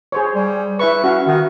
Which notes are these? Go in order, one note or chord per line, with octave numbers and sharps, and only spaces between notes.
G#4 C5 C#5
G3
E4 B4 E5 C#6
C#4 F#4 F5
D#3 F#4